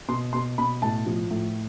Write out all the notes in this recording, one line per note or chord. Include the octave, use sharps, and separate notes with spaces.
B2 C6
B2 C6
B2 B5
A2 A5
F3
A2